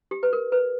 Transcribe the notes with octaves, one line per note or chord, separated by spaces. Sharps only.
G4
B4
A#4
B4